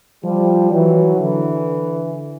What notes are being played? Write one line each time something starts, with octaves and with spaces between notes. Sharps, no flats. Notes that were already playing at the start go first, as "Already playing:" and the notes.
F3 G3
E3 F#3
D3 E3